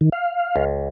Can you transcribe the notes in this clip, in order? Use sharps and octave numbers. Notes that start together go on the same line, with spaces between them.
D#3
F5
C#2